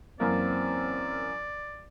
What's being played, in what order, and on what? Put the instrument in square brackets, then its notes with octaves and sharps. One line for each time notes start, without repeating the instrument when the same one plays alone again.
[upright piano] F#2 E3 A#3 [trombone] C4 [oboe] D5